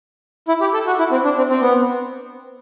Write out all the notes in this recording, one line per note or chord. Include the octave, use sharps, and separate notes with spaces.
E4
G4
A4
F#4
E4
C4
D4
C4
C4
B3